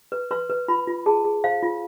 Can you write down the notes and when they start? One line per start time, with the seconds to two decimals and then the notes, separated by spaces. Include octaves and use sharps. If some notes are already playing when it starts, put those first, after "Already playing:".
0.12 B4
0.31 B4 C6
0.50 B4
0.68 F4 B5
0.87 F4
1.06 G#4 A5
1.25 G#4
1.44 C5 F5
1.62 F4